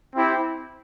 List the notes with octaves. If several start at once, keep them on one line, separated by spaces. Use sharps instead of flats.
C4 E4 G4